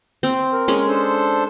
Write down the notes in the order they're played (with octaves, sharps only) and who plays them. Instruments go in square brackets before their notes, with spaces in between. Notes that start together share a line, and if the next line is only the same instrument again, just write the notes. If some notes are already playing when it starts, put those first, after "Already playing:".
[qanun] C4
[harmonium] A#4
[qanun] G#3 C#4
[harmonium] D4 A4 C5